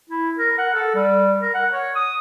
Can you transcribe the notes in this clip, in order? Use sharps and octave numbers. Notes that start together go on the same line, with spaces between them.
E4
A#4
F#5
A4
G3
A#4
F#5
C#5
D#6